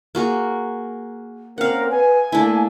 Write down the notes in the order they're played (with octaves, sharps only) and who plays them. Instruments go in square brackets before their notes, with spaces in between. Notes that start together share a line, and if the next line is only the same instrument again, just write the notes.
[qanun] A#3 F#4 G#4
[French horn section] A#3 C4 C#4 [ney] A#4 [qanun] F5 F#5
[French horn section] B4 [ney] G#5
[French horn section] A3 A#3 [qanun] D4 E4